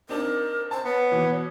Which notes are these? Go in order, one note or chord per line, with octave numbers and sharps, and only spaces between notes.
C4 D4 D#4 A#4
C5 A5
B3 C#5
B2 E3